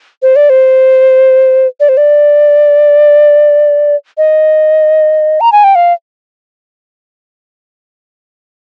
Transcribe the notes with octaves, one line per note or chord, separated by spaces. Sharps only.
C5
D5
C5
D5
C5
D5
D#5
A#5
G#5
G5
F5